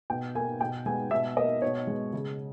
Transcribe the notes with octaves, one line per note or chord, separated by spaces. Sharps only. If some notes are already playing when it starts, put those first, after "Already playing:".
B2 G5
A#3 G#5
B2 G5
G#3 B3 G#5
B2 E5
A#3 D#5
B2 C#5
G#3 B3
C#3